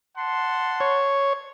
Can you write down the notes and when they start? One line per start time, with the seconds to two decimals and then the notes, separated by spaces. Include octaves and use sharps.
0.17 F#5 A5 C6
0.80 C#5